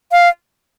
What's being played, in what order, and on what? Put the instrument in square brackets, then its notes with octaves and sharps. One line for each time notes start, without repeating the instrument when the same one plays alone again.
[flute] F5